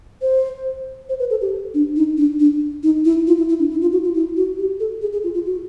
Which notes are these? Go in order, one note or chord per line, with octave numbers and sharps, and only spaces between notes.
C5
C5
B4
A4
G4
D4
D#4
D4
D4
D#4
E4
F4
E4
E4
D4
E4
F4
F#4
F4
E4
F#4
G4
A4
G#4
G#4
F4
F4
F#4